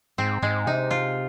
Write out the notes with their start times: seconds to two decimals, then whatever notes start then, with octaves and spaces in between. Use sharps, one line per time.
0.18 G#2 C4
0.43 G#2 G#3
0.67 C3 D#4
0.91 F4